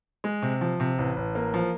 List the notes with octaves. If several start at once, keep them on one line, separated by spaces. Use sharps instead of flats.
G#3
C3
F3
C3
A1
A1
A#3
F3